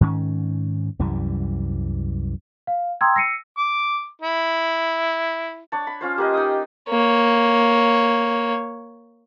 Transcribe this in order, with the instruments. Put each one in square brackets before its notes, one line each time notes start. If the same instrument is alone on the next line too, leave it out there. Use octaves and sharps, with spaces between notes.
[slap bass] G#2 D#3 C#4
C2 F#2 E3 G3
[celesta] F5
G5 A#5 C6 D#6 E6 G#6
E6 A#6 C7 C#7 D#7
[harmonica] D6
E4
[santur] D4 C#5 A5
B5
C#4 F4 C5
[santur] A#3 B4 D#5 [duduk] G4
[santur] D#4 G5 D#6
[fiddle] A#3 C#5